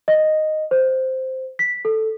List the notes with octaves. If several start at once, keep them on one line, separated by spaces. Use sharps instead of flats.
D#5
C5
B6
A4